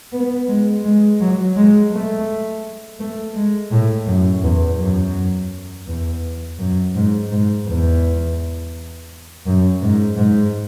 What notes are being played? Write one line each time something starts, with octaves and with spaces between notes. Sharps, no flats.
B3
G#3
G#3
F#3
G#3
A3
A3
G#3
A2
F#2
E2
F#2
E2
F#2
G#2
G#2
E2
F#2
G#2
G#2